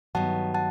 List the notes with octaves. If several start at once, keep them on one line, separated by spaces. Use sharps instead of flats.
G2 D#3 F#3 B3 F#5 A5
F#5 A5